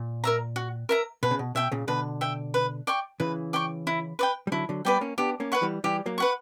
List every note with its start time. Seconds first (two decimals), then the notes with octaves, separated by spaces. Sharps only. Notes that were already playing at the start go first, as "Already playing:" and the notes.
Already playing: A#2
0.24 A#4 E5 A#5
0.56 F#4
0.89 A#4 E5 A#5
1.23 B2 B4
1.31 C#3
1.39 B2
1.55 B2 E5 G5
1.72 A#2 C#3
1.87 B2 D3 B4
2.21 E5 G5
2.54 B4
2.87 D5 G5 C#6
3.20 C#3 E3 B4
3.53 D5 G5 C#6
3.87 E4
4.19 B4 D5 G5
4.47 G3
4.52 D3 F#3 E4
4.69 D3 F#3
4.85 G3 B3 B4 D5 G5
5.01 A#3 C#4
5.18 B3 D4 G4
5.40 A#3 C#4
5.52 B4 F#5 C#6
5.62 E3 G3
5.84 E3 G3 G4
6.06 F#3 A#3
6.18 B4 F#5 C#6